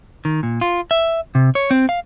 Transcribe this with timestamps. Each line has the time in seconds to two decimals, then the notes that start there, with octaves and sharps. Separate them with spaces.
0.25 D#3
0.43 A#2
0.61 F4
0.91 E5
1.35 C3
1.55 C#5
1.71 C4
1.89 F5